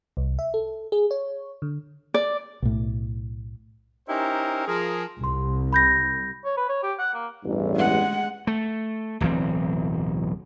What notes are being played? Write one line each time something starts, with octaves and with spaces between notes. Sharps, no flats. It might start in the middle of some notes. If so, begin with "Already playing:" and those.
C2
E5
A4
G#4
C#5
D3
D5
B1 A2
C#4 D#4 E4 G4 A#4 C5
F3 G#4 A#4
C2 C6
B5 G6 A#6
C#5
B4
C#5
G4
F#5
A#3
A1 E2 G2
G#3 F#5
A3
D1 B1 E3 C4